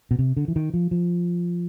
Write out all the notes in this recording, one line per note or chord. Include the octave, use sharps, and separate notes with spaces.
B2
C3
D3
E3
D#3
F3
F3